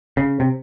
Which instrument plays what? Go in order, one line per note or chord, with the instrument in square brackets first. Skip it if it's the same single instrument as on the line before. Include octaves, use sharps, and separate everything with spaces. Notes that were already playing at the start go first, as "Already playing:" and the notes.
[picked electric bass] C#3
C3